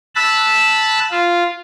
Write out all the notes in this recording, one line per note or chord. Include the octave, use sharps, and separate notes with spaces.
A5 B5 E6 F#6
F4